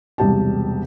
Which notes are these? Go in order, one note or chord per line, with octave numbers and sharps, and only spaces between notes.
E1 C2 G4 A5